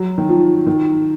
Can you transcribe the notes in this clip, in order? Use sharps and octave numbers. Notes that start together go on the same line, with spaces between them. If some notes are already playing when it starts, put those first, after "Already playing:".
Already playing: F#3
D#3
F3
D#3